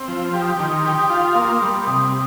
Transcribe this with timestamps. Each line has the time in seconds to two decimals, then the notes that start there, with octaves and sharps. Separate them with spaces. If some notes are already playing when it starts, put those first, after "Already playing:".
Already playing: C4
0.08 F3
0.34 G4 C6
0.41 D#6
0.48 C6
0.55 D#6
0.60 D#3 C6
0.70 D#6
0.78 C6
0.85 G4 D#6
0.92 C6
0.99 D#6
1.07 C6
1.10 F4 D#6
1.21 C6
1.28 D#6
1.35 A#3 C6
1.42 D#6
1.50 C6
1.57 D#6
1.62 G3 C6
1.87 C3 D#6